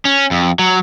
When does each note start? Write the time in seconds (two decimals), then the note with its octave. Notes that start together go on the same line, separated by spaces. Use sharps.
0.05 C#4
0.31 F2
0.59 F#3